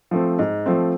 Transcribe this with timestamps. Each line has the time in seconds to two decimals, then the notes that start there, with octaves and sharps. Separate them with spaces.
0.11 F3 A3 C4
0.39 G#2
0.66 F3 A3 C4